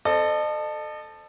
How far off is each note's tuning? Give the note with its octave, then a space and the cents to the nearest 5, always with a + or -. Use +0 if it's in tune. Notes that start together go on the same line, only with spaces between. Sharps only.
A4 +0 C5 +0 D#5 -40